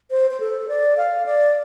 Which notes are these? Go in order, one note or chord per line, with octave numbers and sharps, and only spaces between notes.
C5
C5
A4
D5
F5
D5